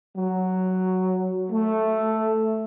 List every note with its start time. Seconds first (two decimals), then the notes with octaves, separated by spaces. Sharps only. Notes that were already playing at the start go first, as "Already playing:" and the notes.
0.16 F#3
1.51 A3